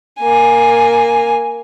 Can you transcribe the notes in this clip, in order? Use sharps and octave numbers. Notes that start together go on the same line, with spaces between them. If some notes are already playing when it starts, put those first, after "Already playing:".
A#3 G#5